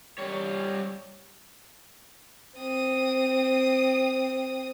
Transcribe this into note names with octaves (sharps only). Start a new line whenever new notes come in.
G3 C#5
C4 D#6